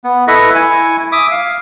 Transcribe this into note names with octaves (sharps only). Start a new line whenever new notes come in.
B3
E4 A4 B4 D#5 E5 C#6
E4 G#5 C#6
E5 D6 D#6
F5